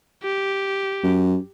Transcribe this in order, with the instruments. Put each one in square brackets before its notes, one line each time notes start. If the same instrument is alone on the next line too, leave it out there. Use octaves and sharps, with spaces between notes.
[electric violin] G4
[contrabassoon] F#2